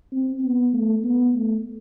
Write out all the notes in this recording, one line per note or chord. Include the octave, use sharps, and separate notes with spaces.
C4
B3
A3
B3
A3